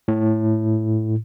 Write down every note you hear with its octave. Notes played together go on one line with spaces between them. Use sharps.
A2